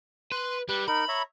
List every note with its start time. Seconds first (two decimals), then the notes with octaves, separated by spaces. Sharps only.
0.32 B4 C6
0.69 G3 B4
0.88 D#4 A#4 B5
1.08 C#5 E5 A#5